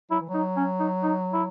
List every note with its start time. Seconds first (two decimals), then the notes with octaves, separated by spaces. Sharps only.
0.11 F#3 E4
0.21 E3
0.29 F#3
0.34 D#4
0.57 C#4
0.80 D#4
1.03 D#4
1.33 E4